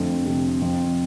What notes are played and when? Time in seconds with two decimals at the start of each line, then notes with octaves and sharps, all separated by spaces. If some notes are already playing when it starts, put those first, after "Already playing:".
Already playing: F2 D3 A3
0.26 C3
0.62 F2